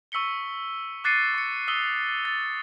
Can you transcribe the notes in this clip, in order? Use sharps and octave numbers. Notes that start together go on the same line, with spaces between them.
C#6 E6 B6 C#7 G7
D6 F#6 A6 C7 C#7 D#7
C#6 C#7
D#6 E6 B6 G7
A6